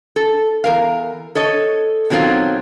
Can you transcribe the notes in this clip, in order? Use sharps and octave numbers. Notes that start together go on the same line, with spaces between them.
A4
E2 A#4 F5
A4 C#5 D#5
B2 D#3 F#3 C4 F4